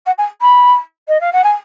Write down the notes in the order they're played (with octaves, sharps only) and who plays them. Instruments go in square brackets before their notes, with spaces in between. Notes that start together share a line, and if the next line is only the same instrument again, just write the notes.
[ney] F#5
G#5
B5
D#5
F5
F#5
G#5